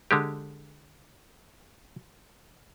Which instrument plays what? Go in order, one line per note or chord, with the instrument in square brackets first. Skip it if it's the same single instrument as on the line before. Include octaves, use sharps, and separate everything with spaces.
[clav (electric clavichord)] D3 G#3 G4